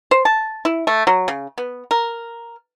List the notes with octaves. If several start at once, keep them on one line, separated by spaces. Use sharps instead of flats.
C5
A5
E4
A3
F#3
C#3
B3
A#4